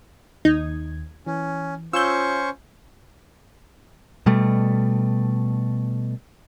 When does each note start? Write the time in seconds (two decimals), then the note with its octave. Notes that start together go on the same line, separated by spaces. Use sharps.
0.45 D#2 D#4 G#6
1.27 E3 C#4
1.93 C#4 F4 C5 C#6 E6 G6
4.26 B2 G3 A3